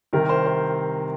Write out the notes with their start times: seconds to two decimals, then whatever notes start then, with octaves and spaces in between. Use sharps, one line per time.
0.13 C2 C3 D#3 A#4
0.29 C5
0.46 C5